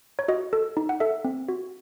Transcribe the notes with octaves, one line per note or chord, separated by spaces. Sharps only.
C#5
F#4 D#5
A4
D#4
F#5
A4 E5
C4
F#4